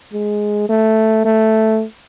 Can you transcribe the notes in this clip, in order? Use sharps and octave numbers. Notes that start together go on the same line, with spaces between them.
G#3
A3
A3